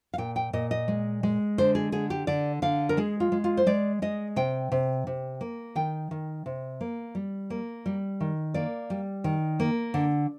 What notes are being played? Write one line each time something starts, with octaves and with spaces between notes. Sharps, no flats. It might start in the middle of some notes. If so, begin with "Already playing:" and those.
F5
A#2 G5
G5
A#2 D#5
D#5
G#3
G#3
D3 C5
G#4
D3 G#4
G4
D3 D5
D3 F5
A#4
G#3 G#4
F4
G#3
F4
C5
G#3 D5
G#3 D#5
C3 G5
C3
C3
A#3
D#3 G5
D#3
C3
A#3
G3
A#3
G3
D#3
A#3 D5
G3
D#3
A#3
D3